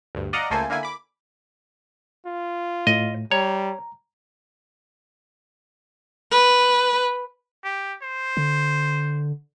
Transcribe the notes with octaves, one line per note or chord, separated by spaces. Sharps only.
D2 G2
D5 D#5 F5 F#5 A#5
C#2 A3 A#3 A4 C5 G#5
D3 A#3 E4 G#5
B5 D6
F4
A2 D#5
G3 C#5 A#5
B4
G4
C5
D3